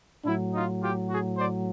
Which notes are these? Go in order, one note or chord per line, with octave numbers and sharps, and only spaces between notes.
A2 F#3 D4 E4
D#4 F4
F4 G4
F#4 G#4
C5 D5